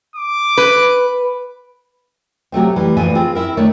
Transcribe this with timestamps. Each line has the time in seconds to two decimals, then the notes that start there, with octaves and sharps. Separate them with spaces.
0.16 D6
0.57 B4
2.52 C3 F#3 A3 C4
2.76 E3 G3
2.97 D2 A#2 E3 F3 B4 G#5
3.15 C4 F4 G#4
3.35 C4 E4 A#4
3.57 D#3 A3 D4 C#5